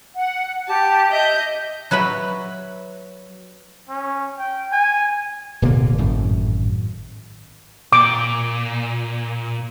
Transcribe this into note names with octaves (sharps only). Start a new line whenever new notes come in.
F#5
G4 A5
D#5 E5 G6
F#3 B4 E5 B5
C#4
G5
G#5
D1 B2 D3 A#3
G#1 F#2 A2
A#2 D6